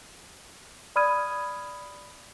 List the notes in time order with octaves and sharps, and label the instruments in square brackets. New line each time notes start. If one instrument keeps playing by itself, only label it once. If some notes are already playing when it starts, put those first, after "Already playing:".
[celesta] D5 B5 D#6 F6 G#6 D#7